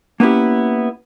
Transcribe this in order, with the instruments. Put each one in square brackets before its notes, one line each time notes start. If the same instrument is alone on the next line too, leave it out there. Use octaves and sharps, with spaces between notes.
[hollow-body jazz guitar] A#3 B3 C#4 E4 G4